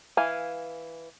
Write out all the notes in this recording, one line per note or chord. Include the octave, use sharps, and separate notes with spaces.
E3 F5 G#5